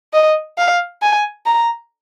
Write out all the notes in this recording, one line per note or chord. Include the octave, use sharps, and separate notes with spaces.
D#5
F5
G#5
A#5